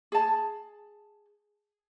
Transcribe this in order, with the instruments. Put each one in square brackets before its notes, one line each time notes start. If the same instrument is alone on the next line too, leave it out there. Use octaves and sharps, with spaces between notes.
[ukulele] G#4 A5